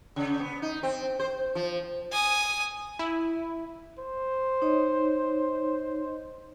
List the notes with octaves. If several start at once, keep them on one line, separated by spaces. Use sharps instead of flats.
C#3
B3
D#4
C4
C5
F3
G#5 D#6
E4
C5
D#4 C#5 D#5